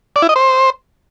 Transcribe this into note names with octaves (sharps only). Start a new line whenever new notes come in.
D5
E4
D#5
C5